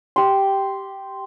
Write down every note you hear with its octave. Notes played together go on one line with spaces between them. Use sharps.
G4 C6